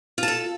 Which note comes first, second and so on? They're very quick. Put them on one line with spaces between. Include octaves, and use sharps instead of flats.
F4 A5 A4